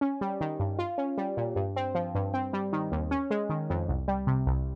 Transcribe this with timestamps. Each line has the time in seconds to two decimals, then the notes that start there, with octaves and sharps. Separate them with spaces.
0.01 C#4
0.21 G3
0.41 D#3
0.60 G2
0.79 F4
0.98 C#4
1.18 G3
1.37 A#2
1.56 G2
1.76 C4
1.95 F3
2.15 G2
2.34 C4
2.53 G3
2.73 D#3
2.92 D#2
3.11 C#4
3.31 G#3
3.50 D#3
3.70 F2
3.88 C2
4.08 G3
4.27 C3
4.46 C2